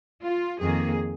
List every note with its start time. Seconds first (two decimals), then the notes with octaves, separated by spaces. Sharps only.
0.22 F4
0.60 F2 D#3 A#3 G#4